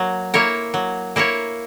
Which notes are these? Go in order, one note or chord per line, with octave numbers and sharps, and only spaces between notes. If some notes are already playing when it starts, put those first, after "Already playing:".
Already playing: F#3 A#3
A#3 E4 A#4 C#5
F#3
A#3 E4 A#4 C#5